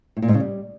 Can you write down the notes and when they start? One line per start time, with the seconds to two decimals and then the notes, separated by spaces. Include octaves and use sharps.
0.17 A2
0.22 A#2
0.28 G#2
0.34 C#3
0.40 G3